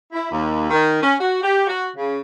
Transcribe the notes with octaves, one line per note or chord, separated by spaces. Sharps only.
E4
D#2
D#3
C#4
F#4
G4
F#4
C#3